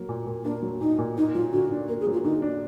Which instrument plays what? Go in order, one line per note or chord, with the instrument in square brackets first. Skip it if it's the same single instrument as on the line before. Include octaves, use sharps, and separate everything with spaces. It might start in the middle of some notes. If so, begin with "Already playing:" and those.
Already playing: [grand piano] F#3 A#3
A#2
A#2
[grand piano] A#3 [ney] D4
[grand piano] F#3
[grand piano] A#2 [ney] D#4
[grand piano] A#2
[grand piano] A#3 [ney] D#4
[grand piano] F#3 [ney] F4
[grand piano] D3 [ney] F#4
[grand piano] D4
[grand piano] A#3 [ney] A#4
[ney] G#4
[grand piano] F#3
[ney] F4
[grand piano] D3 [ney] D#4
[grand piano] D4